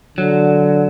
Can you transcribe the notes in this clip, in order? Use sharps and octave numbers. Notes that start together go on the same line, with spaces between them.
D3 F#3